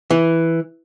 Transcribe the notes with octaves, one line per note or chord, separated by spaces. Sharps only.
E3